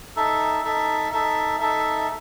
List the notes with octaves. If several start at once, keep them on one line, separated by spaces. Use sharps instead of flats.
D#4 A4 E5
D#4 A4 E5
D#4 A4 E5
D#4 A4 E5